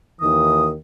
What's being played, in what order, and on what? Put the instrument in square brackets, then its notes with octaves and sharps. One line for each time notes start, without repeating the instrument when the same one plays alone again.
[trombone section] D#2 D#3 E3 [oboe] D#6